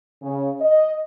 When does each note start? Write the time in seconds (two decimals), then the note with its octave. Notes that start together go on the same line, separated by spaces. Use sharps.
0.22 C#3
0.60 D#5